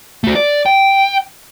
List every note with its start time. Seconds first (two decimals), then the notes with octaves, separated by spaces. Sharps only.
0.24 A3 F#4
0.35 D5
0.66 G5